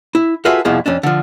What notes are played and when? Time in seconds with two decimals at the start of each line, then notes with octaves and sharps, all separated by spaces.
0.15 E4
0.45 F4 F#4 G#4 A4 B4 E5
0.65 C2 F2 B2 F3 E4 G#4
0.86 F2 C#4 D4
1.03 D3 F3